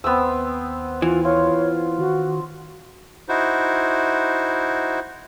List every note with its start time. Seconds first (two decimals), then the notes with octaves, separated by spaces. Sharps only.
0.04 D#2 B3 C4 E6
1.02 E3 F4
1.25 F4 C#5
1.98 D#3 F#4
3.29 D#4 E4 F#4 C5